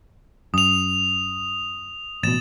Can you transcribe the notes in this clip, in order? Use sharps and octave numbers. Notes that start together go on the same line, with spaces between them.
F#2 D#6 F7
A1 B2 A6 E7